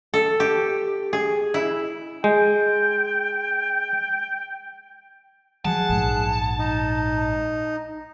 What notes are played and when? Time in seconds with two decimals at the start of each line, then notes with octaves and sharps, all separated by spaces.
0.14 A4
0.40 G4
1.13 G#4
1.54 E4
2.24 G#3 G5
5.65 F3 F#3 G#4 F#5 A5
5.89 A#1 G#2
6.59 D#4